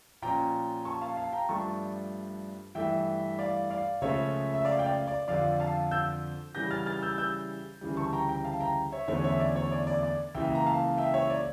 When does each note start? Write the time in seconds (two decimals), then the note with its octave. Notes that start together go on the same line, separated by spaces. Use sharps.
0.22 A#2 F3 C#4 G5 A#5
0.85 A5 C#6
1.01 F5 A5
1.17 F5 A5
1.32 G5 A#5
1.49 G2 F3 A3 D4 A5 C#6
2.75 G2 E3 A3 E5 G5
3.39 D5 F5
3.70 D5 F5
4.01 C#2 C#3 F3 A3 C#4 C#5 E5
4.54 E5
4.65 D5 F5
4.79 G5
4.86 D5 F5
5.07 D5
5.28 F2 D3 F3 D5 F5
5.60 F5 A5
5.91 E6 G6
6.55 C#3 E3 G3 C#4 G6 A#6
6.71 F6 A6
6.86 F6 A6
7.02 E6 G6
7.18 E6 G6
7.81 D2 C#3 E3 G3
7.97 A5 C#6
8.13 G5 A#5
8.29 G5 A#5
8.44 F5 A5
8.60 G5 A#5
8.92 C#5 E5
9.08 E2 D3 A3 C#4 C#5
9.24 C#5 E5
9.39 D5
9.56 C#5
9.72 D5
9.87 D5
10.03 D5
10.34 C#2 C#3 E3 A#3 E5 G5
10.55 A#5
10.66 F5 A5
10.98 E5 G5
11.14 C#5 E5
11.30 D5